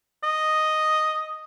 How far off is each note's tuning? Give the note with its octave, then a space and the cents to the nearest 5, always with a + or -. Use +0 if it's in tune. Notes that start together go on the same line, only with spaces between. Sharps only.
D#5 +0